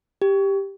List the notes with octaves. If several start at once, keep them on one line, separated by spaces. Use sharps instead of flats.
G4